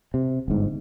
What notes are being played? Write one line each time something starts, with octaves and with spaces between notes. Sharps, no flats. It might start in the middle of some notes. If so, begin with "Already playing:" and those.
C3
G1 G#2